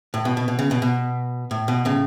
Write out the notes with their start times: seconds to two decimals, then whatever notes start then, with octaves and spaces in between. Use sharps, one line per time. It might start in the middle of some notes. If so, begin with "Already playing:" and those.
0.14 A2
0.25 B2
0.37 B2
0.48 B2
0.59 C#3
0.71 B2
0.82 B2
1.51 A2
1.68 B2
1.85 A2 C#3